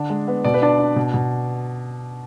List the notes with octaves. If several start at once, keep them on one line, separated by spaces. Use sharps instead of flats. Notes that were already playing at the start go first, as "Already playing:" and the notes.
Already playing: D3 D4
G#3
B3
B2 D5
B4
D4 D5
D4
B2
B2